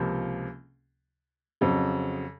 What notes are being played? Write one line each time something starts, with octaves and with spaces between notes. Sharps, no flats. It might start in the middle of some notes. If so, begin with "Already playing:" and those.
Already playing: C#2 C3 F3 A#3
F2 C#3 F#3 C4